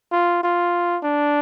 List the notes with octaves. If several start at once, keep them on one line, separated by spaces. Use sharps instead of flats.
F4
F4
D4